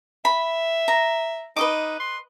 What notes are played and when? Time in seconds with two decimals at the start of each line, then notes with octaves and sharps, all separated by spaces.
0.25 E5 B5
0.88 A#5
1.57 D#4 B4 D#5 D6
2.00 C6